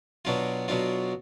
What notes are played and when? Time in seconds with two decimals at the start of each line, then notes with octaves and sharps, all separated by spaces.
0.25 B2 F#3 D4 F4
0.68 B2 F#3 D4 F4